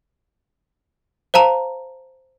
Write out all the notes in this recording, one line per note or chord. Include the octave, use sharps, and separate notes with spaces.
C5 F5 A5 A#5 F7